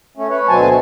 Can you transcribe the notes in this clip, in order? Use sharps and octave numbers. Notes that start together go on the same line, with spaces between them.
A3 C#4
B4 C#5
D2 B2 F#3 C4 G#5 A5